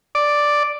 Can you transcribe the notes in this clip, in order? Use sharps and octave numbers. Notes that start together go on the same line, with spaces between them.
D5